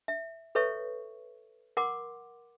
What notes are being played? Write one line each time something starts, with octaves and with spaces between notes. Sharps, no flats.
E5
A4 B4 C#5 E5 C#6
A#4 F#5 C6 D6